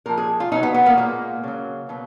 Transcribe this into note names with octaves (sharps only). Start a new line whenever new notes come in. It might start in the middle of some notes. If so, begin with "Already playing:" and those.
A#2 F3 G#3 A#4
G#4
F4
B2 F#3 D#4
B3
B3
A#3
A#2 G#3 A#3
C#3 F#3
B2 F#3